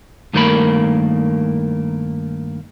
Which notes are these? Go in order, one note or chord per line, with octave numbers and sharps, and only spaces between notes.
G2 D#3 A3 A#3 A#4 B5